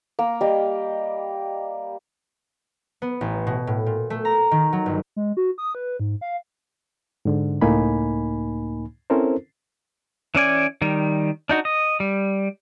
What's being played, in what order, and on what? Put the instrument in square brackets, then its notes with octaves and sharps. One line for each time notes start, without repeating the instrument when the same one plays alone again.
[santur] A#3
G3 D#5
[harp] B3
A1
B2
A2
A#2
A3
A#5
D#3
F#3
G1
[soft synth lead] G#3
F#4
D#6
B4
G#2
F5
[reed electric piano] G#2 D3
C#2 A2 A#3 D#4 G#5 B5
C4 C#4 E4 A4 A#4 C5
[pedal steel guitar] E3 C#4 D5 G#5
D#3 G3
D4 D#4 F#4
D#5
G3